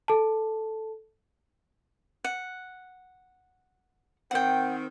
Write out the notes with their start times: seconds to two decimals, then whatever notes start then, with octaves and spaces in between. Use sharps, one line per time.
0.08 A4 A5
2.24 F#5
4.31 D#3 C4 F#5 G5